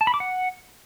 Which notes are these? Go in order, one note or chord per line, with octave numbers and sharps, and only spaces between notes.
A5
B5
D6
F#5